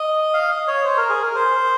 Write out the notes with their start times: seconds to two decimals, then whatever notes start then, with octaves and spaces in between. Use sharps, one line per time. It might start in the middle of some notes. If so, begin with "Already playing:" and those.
Already playing: D#5
0.34 F5
0.51 D#5
0.67 C#5
0.84 C5
0.97 A#4
1.09 G#4
1.22 A#4
1.35 C5